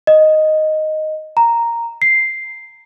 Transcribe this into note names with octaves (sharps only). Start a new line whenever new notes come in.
D#5
A#5
C7